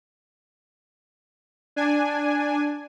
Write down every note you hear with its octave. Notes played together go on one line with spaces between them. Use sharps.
D4 G#5